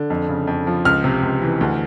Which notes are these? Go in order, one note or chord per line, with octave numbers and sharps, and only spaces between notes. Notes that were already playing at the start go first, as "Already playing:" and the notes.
Already playing: D3
F2
C#3
F2
F3
C#2 F6
C3
C#2
E3
D2